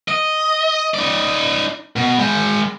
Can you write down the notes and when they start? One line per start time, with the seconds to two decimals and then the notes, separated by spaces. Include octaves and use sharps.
0.08 D#5
0.94 D#4 D5
1.96 B2
2.18 G#3 G5